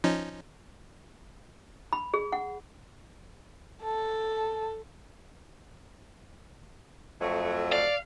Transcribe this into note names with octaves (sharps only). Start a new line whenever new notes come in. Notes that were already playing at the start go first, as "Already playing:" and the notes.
F3 C#4 D#4
B5
G#4
F#5
A4 A5
F2 F#3 A3
D5 F5